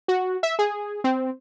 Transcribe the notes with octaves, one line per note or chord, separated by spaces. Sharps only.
F#4
E5
G#4
C4